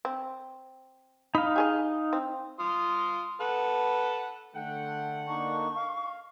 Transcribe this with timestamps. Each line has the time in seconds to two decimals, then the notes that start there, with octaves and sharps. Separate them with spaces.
0.05 C4
1.35 D#4 F5 B5
1.56 G4 G#4 D#5
2.13 C4
2.60 F4 C6 D#6
3.40 A4 B4 F#5
4.55 D3 A3 A4 F#5 G5
5.28 A#3 D4 D#4 C#6
5.76 F5